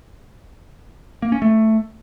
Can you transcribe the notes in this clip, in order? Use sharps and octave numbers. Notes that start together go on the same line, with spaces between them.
A#3
C#4
A3